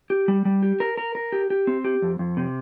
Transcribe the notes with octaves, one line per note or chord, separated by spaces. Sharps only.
G4
G3
G3
G4
A#4
A#4
A#4
G4
G4
C4
G4
F2
F2
C3